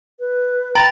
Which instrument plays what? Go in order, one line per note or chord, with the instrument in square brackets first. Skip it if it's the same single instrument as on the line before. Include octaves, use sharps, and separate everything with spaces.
[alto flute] B4
[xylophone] G5 B5 [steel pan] A#5 [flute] A6